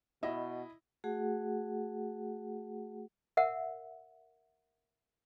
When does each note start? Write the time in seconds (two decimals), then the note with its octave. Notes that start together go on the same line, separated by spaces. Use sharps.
0.23 B2 E4 D#5
1.04 A3 F#4 G#4 F#5
3.37 A#4 E5 F#5